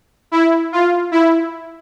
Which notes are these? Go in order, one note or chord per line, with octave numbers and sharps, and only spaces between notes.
E4
F4
E4